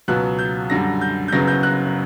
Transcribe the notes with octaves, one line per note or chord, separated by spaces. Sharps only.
C#2 B2 F#3 B3 F#6
G6
F#2 D3 G3 A#6
G6
G6
F#1 F#2 C#3 F#3 B3 A#6
G6
F#6